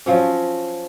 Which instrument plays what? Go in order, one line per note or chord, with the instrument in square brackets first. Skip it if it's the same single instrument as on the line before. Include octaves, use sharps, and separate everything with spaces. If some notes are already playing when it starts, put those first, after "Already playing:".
[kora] F3 F#3 C#4